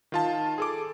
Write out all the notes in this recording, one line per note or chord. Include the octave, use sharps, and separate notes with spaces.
D#3 F4 A5
G#4 A4 D6